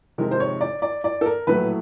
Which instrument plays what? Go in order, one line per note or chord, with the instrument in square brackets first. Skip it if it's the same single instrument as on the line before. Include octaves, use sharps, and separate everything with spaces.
[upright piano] F2 C3 D#3 G#3 A#4
C5
C#5
D5
D5
D5
A4
A#4
A#1 A2 F#3 A3 B4